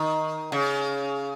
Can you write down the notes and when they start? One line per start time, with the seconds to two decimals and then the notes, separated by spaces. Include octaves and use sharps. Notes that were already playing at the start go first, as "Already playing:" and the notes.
Already playing: D#3
0.52 C#3